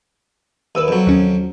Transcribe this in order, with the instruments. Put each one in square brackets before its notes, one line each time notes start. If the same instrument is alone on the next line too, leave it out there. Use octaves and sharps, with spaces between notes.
[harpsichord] D#2 [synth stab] B4 E6 D#7
[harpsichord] F2 F#3
[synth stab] D#2 C#4